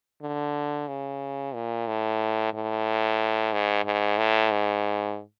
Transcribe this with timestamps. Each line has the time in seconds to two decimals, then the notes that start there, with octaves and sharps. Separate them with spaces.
0.22 D3
0.88 C#3
1.54 A#2
1.88 A2
2.54 A2
3.53 G#2
3.85 G#2
4.18 A2
4.51 G#2